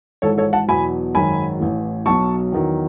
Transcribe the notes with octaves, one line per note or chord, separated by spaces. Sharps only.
G#1 G#2 E3 A4 C#5
A4 C#5
F#5 A5
E2 B2 F#3 G#5 B5
G#1 F#2 D#3 F#3 G#5 B5
A1 A2 E3
B1 B2 F#3 A5 C#6
E2 D#3 F#3